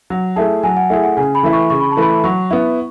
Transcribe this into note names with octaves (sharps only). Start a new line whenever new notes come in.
F#3
A3 E4 G#4 A5
F#3 G#5
F#5
A3 E4 G#4 E5
F#5
C#3 G#5
B5
E3 A3 E4 B4
C#6
C#3 C#6
B5
A5
E3 A3 E4 B4 B5
F#3 C#6
B3 E4